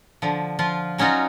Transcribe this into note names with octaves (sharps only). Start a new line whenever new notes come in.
D3 F3
F3 F4
F#3 C#4 D#4 F4 F#4